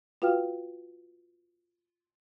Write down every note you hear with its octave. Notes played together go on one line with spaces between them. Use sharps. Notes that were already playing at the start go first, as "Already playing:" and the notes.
F4 F#4 B4 F5 G5 F6